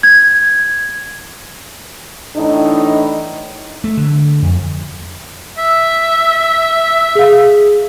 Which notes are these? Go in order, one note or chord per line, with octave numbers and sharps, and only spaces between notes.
G#6
A2 E3 D4 D#4
A3
D3
F2
E5
G#4 F5